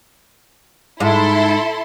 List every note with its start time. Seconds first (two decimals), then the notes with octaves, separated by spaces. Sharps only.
1.00 G#2 E4 A4 C6